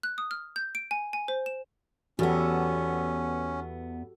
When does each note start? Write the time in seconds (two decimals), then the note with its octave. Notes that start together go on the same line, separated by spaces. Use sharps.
0.03 F#6
0.18 D#6
0.31 F6
0.56 G6
0.75 D7
0.91 G#5
1.13 G#5
1.28 C5
1.46 E7
2.19 E2 B3 C#4 F#4 G4 A4